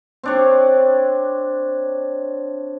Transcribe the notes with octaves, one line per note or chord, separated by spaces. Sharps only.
C4 D4 C#5